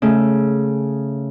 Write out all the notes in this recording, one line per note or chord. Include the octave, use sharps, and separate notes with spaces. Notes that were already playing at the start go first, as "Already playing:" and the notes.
C#3 A3